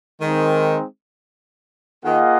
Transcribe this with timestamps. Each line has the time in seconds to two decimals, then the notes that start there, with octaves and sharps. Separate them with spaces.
0.21 D#3 G#3 C4 D#4
2.04 D#3 A#3 F4 G#4 D#5 F#5